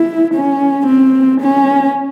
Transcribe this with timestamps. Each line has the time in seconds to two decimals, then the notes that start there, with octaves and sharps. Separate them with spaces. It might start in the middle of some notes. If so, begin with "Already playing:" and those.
Already playing: E4
0.34 C#4
0.86 C4
1.41 C#4